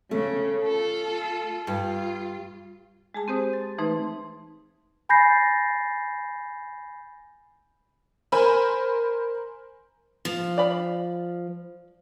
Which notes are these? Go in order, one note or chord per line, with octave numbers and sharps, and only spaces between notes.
C#3 A3
F4 A4
G2 F4
G#3 G#4 A5
C4 G4 C5 D#6
A6
E3 A3 D#4 B4 C6
G#5 B5 G6 A6 A#6 C7
A#4 C5 G#5 B5
F3
D5 B5